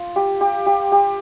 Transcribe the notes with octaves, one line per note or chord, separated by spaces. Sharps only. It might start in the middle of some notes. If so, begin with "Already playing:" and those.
Already playing: F4
G4
G4
G4
G4